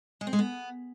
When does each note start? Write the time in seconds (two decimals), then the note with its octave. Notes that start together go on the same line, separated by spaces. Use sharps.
0.21 G#3
0.27 C4
0.33 G#3
0.39 B3